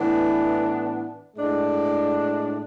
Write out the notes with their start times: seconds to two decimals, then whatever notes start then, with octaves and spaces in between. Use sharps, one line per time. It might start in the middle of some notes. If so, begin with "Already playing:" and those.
Already playing: A2 E3 B3 D4
1.36 A2 G#3 D4